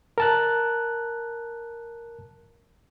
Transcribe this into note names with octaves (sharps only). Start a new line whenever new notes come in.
A#4 A5 F#6